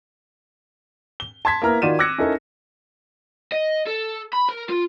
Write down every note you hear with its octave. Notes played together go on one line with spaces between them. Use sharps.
G7
A5 C6 G#6 B6
A#3 B3 E4 A#5 F6
D#3 F4 F#4 D5 D#7 E7
D6 E6 F#6 G#6 A#6 C#7
C#4 D#4 E4 A4 A#4
D#5
A4
B5
A#4
F4